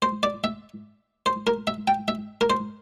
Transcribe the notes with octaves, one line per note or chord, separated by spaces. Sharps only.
C5
D5
E5
C5
A#4
E5
G5
E5
A#4
C5